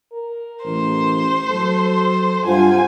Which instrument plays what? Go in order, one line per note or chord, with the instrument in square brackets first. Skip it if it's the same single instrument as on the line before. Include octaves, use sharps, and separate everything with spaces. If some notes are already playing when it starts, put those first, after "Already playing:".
[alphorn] A#4
[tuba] A1 [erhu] C5
[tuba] F#3 [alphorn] A4
[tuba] G2 [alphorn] C3 [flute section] F4 C5 F#5 [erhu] G#5